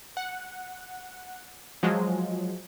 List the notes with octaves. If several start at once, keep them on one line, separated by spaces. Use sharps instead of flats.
F#5
F3 F#3 G#3